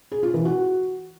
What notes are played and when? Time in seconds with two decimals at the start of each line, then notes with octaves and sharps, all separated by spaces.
0.12 G#4
0.23 F4
0.34 E3
0.45 F#4